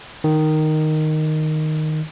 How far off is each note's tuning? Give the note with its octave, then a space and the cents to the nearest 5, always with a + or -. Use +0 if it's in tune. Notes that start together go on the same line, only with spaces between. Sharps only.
D#3 -5